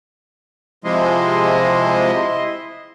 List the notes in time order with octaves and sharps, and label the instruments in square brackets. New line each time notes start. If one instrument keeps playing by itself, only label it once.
[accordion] C3 F3 G#3 [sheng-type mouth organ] E4 D#5 C6